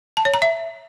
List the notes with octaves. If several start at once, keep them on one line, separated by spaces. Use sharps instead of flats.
A5
C#5
A#5
E5